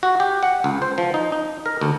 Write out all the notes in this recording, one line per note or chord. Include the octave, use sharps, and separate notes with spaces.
F#4
G4
F#5
C#2
C5
F3
D#4
D#4
A#4
D2